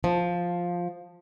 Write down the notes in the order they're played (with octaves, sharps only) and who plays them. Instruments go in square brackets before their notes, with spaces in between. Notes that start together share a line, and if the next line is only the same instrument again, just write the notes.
[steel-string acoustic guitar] F3